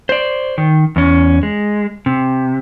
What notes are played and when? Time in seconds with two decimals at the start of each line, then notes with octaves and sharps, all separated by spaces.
0.09 C5 D5
0.58 D#3
0.96 E2 C#4
1.43 G#3
2.06 C3